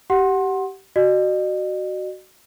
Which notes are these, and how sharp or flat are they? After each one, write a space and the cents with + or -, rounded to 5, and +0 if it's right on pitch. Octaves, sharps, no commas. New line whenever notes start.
G4 -20 F#5 +0 C6 +25
F#4 +10 D#5 -40